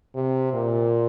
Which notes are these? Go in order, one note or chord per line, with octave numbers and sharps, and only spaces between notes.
C3
A#2